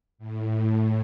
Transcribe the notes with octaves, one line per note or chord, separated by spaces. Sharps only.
A2
A2